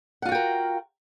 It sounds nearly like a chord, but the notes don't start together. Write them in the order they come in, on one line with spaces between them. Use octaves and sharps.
F#5 F4 F#4 G5 A#4